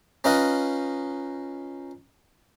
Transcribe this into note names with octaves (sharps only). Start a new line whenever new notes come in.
C#4 D#4 F4 B4 D#5